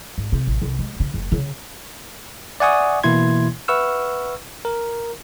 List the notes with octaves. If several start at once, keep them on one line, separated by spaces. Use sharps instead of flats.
G#2
C3
A1
C2
G#3
C#3
F#1
C#3
D5 E5 F#5 G#5 C#6 D#6
B2 E3 A#3 E4 C6 G#6
B4 E5 F#5 C#6 E6 F6
A#4